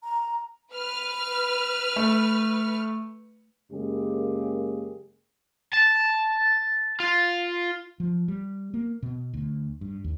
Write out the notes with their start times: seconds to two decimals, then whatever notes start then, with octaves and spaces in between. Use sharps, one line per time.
0.02 A#5
0.73 B4 F6
1.96 A3
3.72 F#2 C#3 G#3 A#3 G4 G#4
5.74 A5
7.00 F4
8.00 F3
8.28 G3
8.74 A#3
9.03 B2
9.34 D2
9.81 G2
10.04 D#2